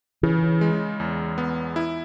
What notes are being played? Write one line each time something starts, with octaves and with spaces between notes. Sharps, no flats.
C#3 E3
G#3
E2
B3
E4